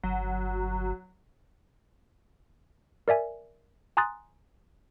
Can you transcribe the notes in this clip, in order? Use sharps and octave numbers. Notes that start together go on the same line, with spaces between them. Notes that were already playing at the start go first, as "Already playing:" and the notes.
G1 F#3
A#4 D5 E5 G#5
G#5 A#5 C6 D#6 F#6 A6